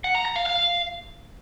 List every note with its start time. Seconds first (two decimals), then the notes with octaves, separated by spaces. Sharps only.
0.04 F#5
0.15 A#5
0.25 A#5
0.36 F5
0.46 F5